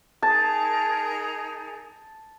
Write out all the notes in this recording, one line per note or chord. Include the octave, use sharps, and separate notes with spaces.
D#4 G#4 A#4 A5